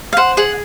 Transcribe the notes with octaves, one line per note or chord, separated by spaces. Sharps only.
F5
C5 F#5
G#4 F#5